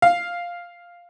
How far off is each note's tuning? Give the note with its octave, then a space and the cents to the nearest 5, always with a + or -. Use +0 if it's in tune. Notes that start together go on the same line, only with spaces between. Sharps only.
F5 +0